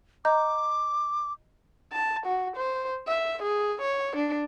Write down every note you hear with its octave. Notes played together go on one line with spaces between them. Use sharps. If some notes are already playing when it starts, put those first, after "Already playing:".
D#5 A#5 D6 G6
A5
F#4
C5
E5
G#4
C#5
D4